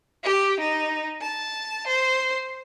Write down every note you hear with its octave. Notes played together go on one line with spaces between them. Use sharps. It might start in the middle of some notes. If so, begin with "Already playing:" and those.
G4
D#4
A5
C5